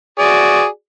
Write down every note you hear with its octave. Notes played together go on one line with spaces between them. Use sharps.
F#4 G#4 D5